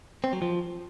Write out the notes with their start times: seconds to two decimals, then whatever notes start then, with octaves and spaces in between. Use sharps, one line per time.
0.24 C4
0.33 F#3
0.42 F3